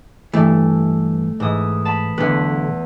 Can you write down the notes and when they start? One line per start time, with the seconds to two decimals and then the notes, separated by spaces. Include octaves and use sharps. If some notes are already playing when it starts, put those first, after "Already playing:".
0.33 G2 E3 A3
1.40 G#2 E3 D#6
1.85 A5 B5
2.18 B1 E2 D3 B4